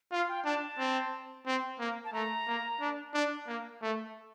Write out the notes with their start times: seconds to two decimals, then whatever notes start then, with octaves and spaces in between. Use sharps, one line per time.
0.11 F4 F5
0.28 G5
0.45 D4 A5
0.78 C4
1.46 C4
1.79 A#3
2.05 A5
2.13 A3 A#5
2.47 A#3
2.80 D4
3.14 D4
3.47 A#3
3.82 A3